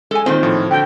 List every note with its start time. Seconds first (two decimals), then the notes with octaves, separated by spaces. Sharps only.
0.11 G#3 A4 G#5
0.26 A#2 D#3 F#3 C4
0.43 A2 F3
0.71 D3 F#4 G5 G6